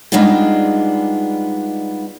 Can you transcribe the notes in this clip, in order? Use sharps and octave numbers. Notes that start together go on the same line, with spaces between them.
G3 G#3 B3 D4 D#4 F4